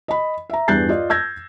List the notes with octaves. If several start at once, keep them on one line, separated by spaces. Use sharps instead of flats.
D#5 B5
E5 A#5
E2 G2 F#6 G6 A6 C7
F4 D5 D#5
E6 G6 G#6 A#6